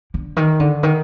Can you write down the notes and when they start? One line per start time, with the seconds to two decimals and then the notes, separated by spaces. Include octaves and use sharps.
0.14 D3
0.36 D#3
0.60 D3
0.83 D#3